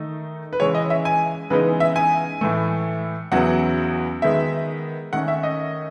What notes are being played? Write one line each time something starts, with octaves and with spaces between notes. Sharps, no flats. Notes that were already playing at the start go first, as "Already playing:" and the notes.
Already playing: D#3 A3 D#4
B4
C#3 E3 G#3 C#5
D#5
E5
G#5
C#3 E3 G#3 B3 D#4 B4
E5
G#5
A2 E3 A3
E2 C#3 F#3 B3 E4 F#5
D#3 G#3 B3 E5
D#3 A3 C#4 F#5
E5
D#5